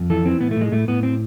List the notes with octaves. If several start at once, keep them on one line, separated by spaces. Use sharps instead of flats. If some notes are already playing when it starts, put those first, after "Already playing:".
Already playing: F2
E3 A4
E3 C4
A2 B3
A3
A2
G#3
A2 A3
A2 B3
C4